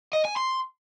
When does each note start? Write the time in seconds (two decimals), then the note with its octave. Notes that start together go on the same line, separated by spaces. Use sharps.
0.13 D#5
0.25 G#5
0.37 C6